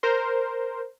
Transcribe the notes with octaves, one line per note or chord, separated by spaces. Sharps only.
A#4 C5